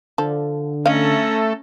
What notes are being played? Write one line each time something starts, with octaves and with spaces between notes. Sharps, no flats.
D3 F3 A4
A3 C#4 A4 D#5 F5 A#5